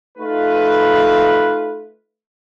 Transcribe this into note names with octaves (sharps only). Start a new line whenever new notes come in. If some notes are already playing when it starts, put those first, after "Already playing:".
A3 D#4 F4 B4